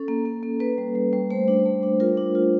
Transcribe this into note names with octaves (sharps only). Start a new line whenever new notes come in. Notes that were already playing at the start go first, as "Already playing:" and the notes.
Already playing: C#4 A4
A#3
A#3
A#3
A#3 B4
G3
G3
G3
A3 C5
D4
A3
D4
F4 A#4
D4
F4